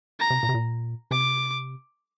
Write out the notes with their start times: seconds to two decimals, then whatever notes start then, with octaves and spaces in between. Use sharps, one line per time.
0.19 A#5
0.30 C3
0.43 A#2
0.49 C3
0.54 A#2
1.11 C3 D6